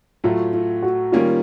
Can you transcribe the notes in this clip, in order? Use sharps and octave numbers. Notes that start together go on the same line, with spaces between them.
A2 F#3 A3 F4
F4
F#4
D#3 G3 A#3 C#4 F4